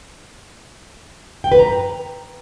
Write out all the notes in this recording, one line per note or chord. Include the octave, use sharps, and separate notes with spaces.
G5
B4
A#5